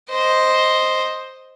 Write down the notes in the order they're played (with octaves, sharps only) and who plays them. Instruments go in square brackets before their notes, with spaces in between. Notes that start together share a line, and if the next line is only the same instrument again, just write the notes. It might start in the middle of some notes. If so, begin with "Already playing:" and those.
[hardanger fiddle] C5 D#5